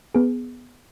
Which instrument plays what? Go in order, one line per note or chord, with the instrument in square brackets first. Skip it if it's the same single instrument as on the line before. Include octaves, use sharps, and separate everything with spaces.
[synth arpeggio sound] B3 G#4